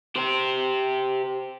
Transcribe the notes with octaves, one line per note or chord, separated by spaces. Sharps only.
G4 C5